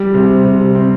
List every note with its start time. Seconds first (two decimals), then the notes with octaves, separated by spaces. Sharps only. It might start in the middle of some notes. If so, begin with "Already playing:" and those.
Already playing: G3
0.14 C3
0.45 C3
0.75 C4